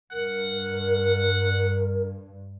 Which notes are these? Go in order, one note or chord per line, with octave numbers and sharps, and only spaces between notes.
G2 A#4 F#5